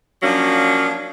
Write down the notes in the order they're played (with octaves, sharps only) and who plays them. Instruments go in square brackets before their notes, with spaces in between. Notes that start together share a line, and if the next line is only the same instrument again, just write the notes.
[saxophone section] F3 F#3 A#3 C#4 D4